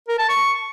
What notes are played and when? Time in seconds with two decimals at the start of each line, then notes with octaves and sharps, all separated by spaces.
0.09 A#4
0.19 A5
0.29 C#6